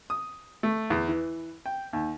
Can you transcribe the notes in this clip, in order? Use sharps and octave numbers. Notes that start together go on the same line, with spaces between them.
D#6
A3
E2
E3
G5
D#2